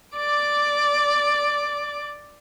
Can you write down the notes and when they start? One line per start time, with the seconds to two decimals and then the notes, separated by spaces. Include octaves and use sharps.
0.16 D5 D6